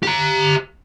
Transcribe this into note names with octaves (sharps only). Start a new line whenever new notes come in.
G4 A#5